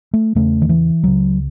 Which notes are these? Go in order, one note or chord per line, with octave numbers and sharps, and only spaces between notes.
A3
E2 C#3 A3
D#3
E3
C#2 C#3 F#3